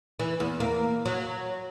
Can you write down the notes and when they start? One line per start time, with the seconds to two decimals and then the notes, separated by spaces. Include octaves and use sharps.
0.20 E3
0.40 E2
0.60 A#3
1.06 F#3